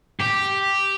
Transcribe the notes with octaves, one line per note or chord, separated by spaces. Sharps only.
G4